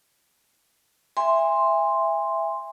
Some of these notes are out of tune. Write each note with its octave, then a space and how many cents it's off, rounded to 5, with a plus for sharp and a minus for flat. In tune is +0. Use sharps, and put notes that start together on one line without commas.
E5 +5 G#5 -30 C6 +0